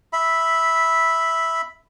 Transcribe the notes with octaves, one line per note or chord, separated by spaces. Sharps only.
E5 B5